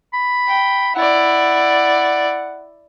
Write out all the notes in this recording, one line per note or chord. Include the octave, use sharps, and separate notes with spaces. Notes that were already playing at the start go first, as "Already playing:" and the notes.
B5
G5
E4 D5 F#5